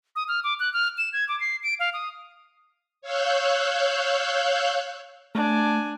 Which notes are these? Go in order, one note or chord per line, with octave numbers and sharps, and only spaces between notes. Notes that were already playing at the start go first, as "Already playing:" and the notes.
D#6
F6
D6
F#6
F6
E7
G#6
D6
C7
D7
F5
D#6
C#5 F5 E6 F#6 G6
A3 D4 G#5